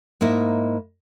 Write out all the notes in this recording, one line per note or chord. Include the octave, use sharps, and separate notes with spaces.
G#2 A#3 D#4 E4